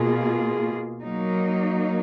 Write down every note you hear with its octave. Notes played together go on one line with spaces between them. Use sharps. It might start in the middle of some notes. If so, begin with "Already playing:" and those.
Already playing: B2 A#3 F4 G#4
F#3 A#3 D#4